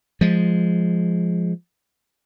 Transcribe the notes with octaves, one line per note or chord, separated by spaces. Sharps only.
F3 G#3